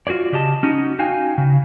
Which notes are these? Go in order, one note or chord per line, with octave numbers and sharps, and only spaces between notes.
F4 F#4 G#4 C#5 D5
C#3 G4 D#5 A5
C#4 D#4 F#4
D#4 F#4 F5 G5 G#5
C#3